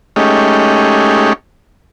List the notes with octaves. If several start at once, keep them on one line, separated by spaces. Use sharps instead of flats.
G#3 A3 C#4 D#4 G4